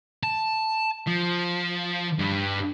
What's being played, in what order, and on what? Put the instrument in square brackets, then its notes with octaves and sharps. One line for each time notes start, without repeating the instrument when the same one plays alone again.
[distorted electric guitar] A5
F3
G2